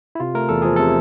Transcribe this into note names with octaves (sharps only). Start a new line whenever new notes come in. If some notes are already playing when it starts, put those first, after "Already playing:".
E4
C3 F4
A3 A#4
E2 A4
F3 G#4
C3 A4